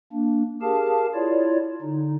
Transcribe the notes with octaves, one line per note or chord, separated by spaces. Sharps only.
A#3 D4
G4 G#4 A#4 F5 A5
E4 F4 C#5 D5
D3 D#4